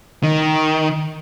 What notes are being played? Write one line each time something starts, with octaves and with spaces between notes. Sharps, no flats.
D#3